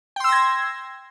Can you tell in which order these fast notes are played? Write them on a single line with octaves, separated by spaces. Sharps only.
G5 C6 E6 A#6 G#6